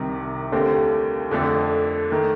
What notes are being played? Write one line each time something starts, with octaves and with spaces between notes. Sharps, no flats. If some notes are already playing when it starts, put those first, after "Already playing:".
Already playing: C2 C3 D#3
D#2 D3 A3 C4 G4
F2 D3 A3 D4 A4
D#3 A3